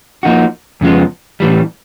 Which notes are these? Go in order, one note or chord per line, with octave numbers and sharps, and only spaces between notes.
F3 A#3 D#4 F#4
F2 C#3 F3 G#3 B3
A2 E3 G3